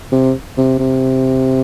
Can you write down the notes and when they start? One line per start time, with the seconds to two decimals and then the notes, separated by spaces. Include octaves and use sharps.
0.12 C3
0.57 C3
0.79 C3